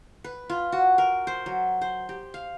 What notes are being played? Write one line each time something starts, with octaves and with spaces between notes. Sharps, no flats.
B4
F4
F#4
A#4
C5
F#3
C5
G4
F5